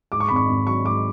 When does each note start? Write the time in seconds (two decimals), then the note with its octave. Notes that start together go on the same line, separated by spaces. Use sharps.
0.12 G#2 D6
0.20 C#6
0.28 G#1 B5
0.36 C#6
0.49 G#1
0.67 F#3 C#6
0.84 G#2 D6